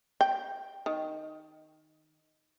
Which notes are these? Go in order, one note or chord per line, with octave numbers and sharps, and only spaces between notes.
G5
D#3